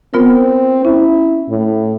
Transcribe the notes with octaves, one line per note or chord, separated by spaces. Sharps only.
B3 C4 F4 A#4
C#4 E4
A2